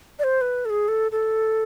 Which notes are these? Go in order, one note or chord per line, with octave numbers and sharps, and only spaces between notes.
D5
C5
B4
A4
G#4
A4
A4